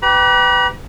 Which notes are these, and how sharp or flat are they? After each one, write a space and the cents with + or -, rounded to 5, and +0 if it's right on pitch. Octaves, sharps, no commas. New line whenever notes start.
G4 -15 B4 +25 B5 -45